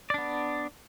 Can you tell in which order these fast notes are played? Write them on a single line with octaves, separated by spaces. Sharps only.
D5 D4 B3